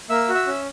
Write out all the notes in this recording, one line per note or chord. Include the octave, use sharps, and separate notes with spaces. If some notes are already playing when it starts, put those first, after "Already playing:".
A#3 E5 E6
F#4
E5 E6
C#4